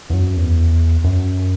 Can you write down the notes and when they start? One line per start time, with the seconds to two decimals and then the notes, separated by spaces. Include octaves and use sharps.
0.10 E2
0.13 F#2
0.37 E2
1.04 F#2